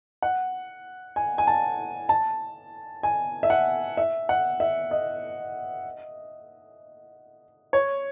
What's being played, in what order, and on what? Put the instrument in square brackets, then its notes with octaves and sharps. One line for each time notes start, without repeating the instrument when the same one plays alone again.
[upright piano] F#5
G#5
G#5
A5
A5
G#5
E5
F#5
E5
F#5
E5
D#5
C#5